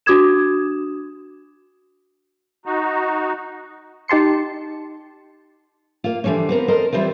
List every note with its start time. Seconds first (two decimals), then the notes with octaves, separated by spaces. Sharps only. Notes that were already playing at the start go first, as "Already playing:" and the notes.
0.06 D4 F#4 D6 D#6 G#6 E7
2.65 D#4 F#4
4.08 D#4 G4 A5 C6 C#7
6.04 A#3 F4
6.24 D3 E3 F3 G3 C#4
6.49 B3 C4 A#4
6.68 A4 A#4 C5 D#5
6.93 E3 G3 C4 E4 F4